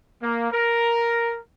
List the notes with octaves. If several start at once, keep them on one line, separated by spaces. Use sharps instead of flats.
A#3
A#4